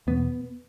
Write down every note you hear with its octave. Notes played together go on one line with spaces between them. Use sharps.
E2 B2 B3